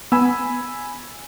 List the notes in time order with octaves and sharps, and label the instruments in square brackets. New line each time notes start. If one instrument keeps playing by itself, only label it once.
[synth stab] B3 [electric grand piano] G#5 B5 E6